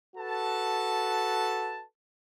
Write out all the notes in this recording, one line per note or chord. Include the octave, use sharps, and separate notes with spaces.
F#4 A4 B4 A5